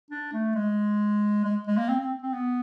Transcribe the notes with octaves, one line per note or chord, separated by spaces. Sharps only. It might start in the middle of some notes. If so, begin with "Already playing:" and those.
D4
A3
G#3
G#3
G#3
A#3
C4
C4
C4
B3